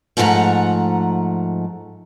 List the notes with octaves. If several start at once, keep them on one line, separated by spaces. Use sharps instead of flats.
G#2 F3 A3 C5 F#5 A#5